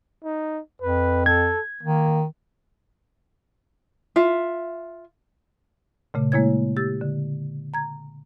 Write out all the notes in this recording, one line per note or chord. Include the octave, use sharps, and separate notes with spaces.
D#4
F2 B4
A4 G#6
D#3 A#3
F4 E5
A#2 C#3 A3
G#3 A#3 E4 C#5 G#6
G4 E6 A6
D3
A#5 G#6